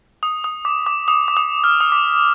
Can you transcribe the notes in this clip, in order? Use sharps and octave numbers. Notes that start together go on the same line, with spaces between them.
D#6
D#6
D6
D6
D#6
D6
D#6
F6
D#6
D6